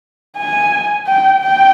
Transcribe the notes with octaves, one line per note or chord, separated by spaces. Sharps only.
G#5
G5
G5